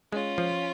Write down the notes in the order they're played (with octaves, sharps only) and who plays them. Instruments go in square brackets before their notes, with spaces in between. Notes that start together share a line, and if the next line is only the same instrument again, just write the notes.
[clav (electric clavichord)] G#3 [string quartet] C#4 F4
[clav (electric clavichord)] F3